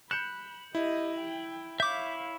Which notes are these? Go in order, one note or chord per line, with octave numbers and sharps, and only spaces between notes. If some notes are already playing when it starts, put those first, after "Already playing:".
B5 F#6 G6 C#7 E7
E4 G4 D#5
G5
E4 C#5 E5 F5 D6 G6